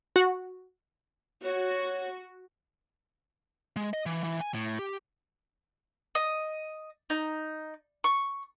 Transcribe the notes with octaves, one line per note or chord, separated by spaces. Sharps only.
F#4
F#4 C#5
G#3
D#5
E3
E3
G#5
A2
G4
D#5
D#4
C#6